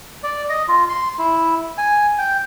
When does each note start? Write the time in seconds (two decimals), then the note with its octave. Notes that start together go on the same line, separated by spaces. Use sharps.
0.23 D5
0.49 D#5
0.68 F4
0.89 C6
1.19 E4
1.78 G#5
2.18 G5